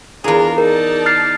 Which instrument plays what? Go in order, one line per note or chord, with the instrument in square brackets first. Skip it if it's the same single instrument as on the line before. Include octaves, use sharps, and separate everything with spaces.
[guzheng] E2 G#4 [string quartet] D4 F4 A#4
[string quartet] D#4 D5 A5 [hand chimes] A#4
[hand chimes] F6 A6 C7